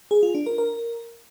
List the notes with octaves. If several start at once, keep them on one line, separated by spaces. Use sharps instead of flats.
G#4
F4
D4
A#4
A#4